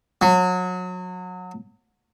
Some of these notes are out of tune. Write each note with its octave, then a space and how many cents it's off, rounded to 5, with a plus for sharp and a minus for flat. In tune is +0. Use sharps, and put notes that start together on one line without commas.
F#3 -25